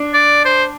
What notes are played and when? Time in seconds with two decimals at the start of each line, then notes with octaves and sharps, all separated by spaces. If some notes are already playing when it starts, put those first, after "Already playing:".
Already playing: D4
0.14 D5
0.45 C5